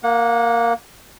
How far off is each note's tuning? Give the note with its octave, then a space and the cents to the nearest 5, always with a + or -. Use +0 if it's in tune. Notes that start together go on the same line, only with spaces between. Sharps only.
A#3 +0 F#5 -30